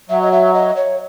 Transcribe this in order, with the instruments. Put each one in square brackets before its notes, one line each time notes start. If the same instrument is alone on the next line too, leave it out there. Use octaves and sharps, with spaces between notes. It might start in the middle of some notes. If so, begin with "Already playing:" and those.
[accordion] F#3 [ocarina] E5
[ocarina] D#5
E5
D#5
C#5